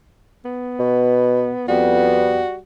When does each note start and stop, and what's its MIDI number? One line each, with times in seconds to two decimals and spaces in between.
0.45 1.68 59
0.79 1.50 47
1.68 2.41 41
1.68 2.58 55
1.68 2.41 59
1.68 2.57 66